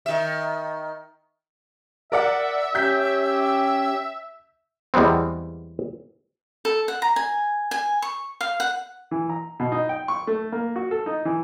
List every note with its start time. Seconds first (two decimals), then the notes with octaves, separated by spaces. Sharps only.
0.06 D#3 E5
2.12 A#4 D5 E5 F#5
2.75 C#4 G4 G5 G6 B6
4.94 E2 G3 G#3 B3 C4
6.65 A4
6.88 F#5
7.02 A#5
7.16 G#5
7.71 G#5
8.02 C#6
8.41 F5
8.60 F#5
9.11 E3
9.30 A#5
9.60 B2
9.72 D#4
9.89 G5
10.08 C#6
10.27 A3
10.52 A#3
10.76 F#4
10.91 A4
11.06 D#4
11.25 E3